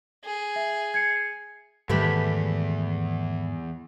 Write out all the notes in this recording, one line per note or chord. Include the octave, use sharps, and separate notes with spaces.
G#4
E5
G#6 C7 C#7
E2 G#2 D#3 G3 A3 G4 B4